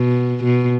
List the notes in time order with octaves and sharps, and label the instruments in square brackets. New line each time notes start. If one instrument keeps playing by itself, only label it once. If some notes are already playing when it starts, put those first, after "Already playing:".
Already playing: [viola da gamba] B2
B2